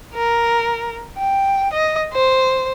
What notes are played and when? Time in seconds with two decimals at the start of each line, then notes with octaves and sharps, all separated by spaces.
0.15 A#4
1.18 G5
1.73 D#5
2.13 C5